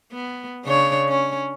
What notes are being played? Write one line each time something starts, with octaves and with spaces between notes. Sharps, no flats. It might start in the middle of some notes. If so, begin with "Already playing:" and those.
B3
C#3 D4 C#5
C#4